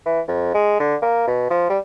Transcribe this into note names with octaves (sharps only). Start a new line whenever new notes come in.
E3
F2
G#3
D3
A#3
B2
F3
G3